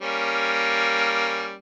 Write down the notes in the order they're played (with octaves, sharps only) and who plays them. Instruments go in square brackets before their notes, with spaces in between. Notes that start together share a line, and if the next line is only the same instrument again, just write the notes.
[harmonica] G3 A#3 C#4